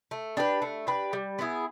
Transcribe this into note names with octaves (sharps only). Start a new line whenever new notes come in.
A3
D4 G4 B4
A3
D4 G4 B4
G3
B3 E4 G#4